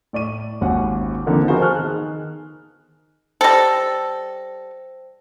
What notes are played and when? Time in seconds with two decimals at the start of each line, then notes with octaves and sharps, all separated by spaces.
0.13 A2 D5 C#6 D#7
0.61 G#1 D#2 C#4 F#5
1.26 D3 D#3 F3 A#3 C4 D4
1.48 B3 F#4 G#4 A#4 C5 F5
1.60 G#5 A5 C#6 F6 F#6
1.76 D#3 G#4
3.41 G3 A4 C5 G5 A#6